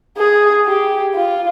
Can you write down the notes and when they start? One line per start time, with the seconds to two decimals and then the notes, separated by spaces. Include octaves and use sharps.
0.17 G#4
0.66 G4
1.15 F4